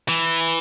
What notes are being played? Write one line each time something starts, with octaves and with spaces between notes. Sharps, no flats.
E3